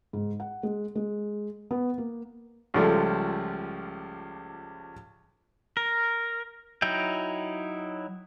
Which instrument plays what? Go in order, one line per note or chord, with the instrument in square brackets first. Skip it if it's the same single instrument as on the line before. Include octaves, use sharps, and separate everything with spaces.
[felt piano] G#2
F#5
G#3
G#3
B3
A#3
[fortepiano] C#2 C#3 F3 G3 A3
[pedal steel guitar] A#4
F#3 D#4 E4 G5